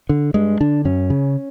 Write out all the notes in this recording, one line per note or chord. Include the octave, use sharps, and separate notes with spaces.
D3
G2 G#3
D3 D4
F#2 C#4
C#3